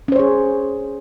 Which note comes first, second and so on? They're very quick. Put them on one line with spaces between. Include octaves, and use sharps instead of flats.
C#4 C5 C#5 G#4